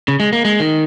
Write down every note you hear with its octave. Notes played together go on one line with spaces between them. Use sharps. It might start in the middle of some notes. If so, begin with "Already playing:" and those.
C#3
G#3
A#3
G#3
D#3